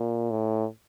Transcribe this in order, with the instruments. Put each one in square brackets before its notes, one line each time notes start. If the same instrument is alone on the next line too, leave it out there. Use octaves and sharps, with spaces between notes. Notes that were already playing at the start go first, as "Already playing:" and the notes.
Already playing: [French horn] A#2
A2